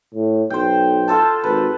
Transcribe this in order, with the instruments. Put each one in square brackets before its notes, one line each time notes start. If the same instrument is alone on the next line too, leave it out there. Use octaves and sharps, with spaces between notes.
[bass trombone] A2
[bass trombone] B1 [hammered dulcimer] C5 G5
[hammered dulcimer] F4 A4 A5
[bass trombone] G#1 [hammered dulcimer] B4